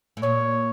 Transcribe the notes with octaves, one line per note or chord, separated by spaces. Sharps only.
A2
A#2 C#5